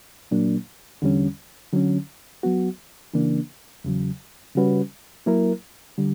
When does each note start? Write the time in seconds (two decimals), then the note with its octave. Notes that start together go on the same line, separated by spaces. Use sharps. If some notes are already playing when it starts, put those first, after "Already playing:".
0.31 A#2 F#3 A#3 D4
1.02 E2 D3 G3 C#4
1.73 D3 F#3 C#4
2.43 F#3 B3 F#4
3.14 C#3 E3 A#3 D4
3.84 E2 C#3 F#3
4.55 C#3 G3 C#4 F#4 B4
5.26 F#3 A#3 E4 A#4
5.98 D3 G3